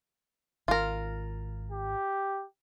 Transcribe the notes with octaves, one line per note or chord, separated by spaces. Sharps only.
G#1 F4 A#4
G4